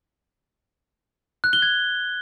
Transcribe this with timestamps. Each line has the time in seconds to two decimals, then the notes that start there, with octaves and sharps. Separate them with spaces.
1.44 F#6
1.53 G7
1.62 G#6